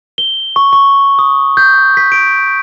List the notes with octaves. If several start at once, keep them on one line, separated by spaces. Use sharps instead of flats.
G7
C#6
C#6
D#6
G6
B6
D7